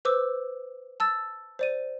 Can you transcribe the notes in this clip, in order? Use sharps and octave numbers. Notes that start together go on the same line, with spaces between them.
B4 C5 D6 E6
A5 E6 A6
C5 D5 D#7